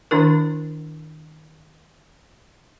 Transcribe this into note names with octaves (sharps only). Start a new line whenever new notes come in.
D#3 D4 E4 A#4